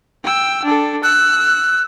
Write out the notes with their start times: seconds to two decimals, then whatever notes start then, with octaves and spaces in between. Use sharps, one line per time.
0.24 G5 E6
0.65 D4 A4
1.03 E6 F#6